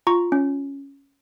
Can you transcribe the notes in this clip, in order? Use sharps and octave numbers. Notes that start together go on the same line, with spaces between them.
F4 A#5 C#6
C#4